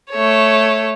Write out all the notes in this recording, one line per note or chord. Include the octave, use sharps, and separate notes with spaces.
A3 C#5